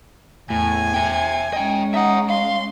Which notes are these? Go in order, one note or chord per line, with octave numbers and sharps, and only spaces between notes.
E2 A2 G#5
E5 G5
G#3 C#4 D#5 G5
D#4 E5 F#5
F5 C6